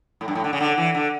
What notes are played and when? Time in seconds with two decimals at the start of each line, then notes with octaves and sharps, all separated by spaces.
0.21 A2
0.28 G2
0.35 A2
0.44 D3
0.53 C#3
0.61 D3
0.78 E3
0.95 D3